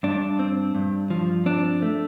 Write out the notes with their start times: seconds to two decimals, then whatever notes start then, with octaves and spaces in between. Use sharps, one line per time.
0.03 G2 D4
0.39 C4
0.75 G2
1.10 F3
1.46 C4 D4
1.82 A3